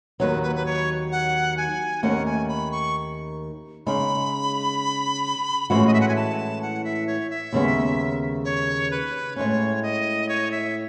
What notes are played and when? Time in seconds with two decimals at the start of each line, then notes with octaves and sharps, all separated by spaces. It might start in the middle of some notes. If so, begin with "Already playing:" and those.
0.20 D#2 D#3 F#3 B4
0.43 B4
0.56 B4
0.66 C#5
1.12 F#5
1.57 G#5
2.03 D#2 D#3 A3 C#4 F#5
2.26 G#5
2.49 B5
2.72 C#6
3.86 C#3 G#3 D#4 B5
5.70 A2 E3 G#3 C#4 F#4 B5
5.87 D#5
5.94 E5
6.01 F#5
6.08 G#5
6.16 A5
6.62 F#5
6.84 E5
7.07 C#5
7.30 E5
7.53 D#2 C#3 G#3 B3
8.45 C#5
8.91 B4
9.36 A2 G#3 C#4 C#5
9.82 D#5
10.29 C#5
10.51 E5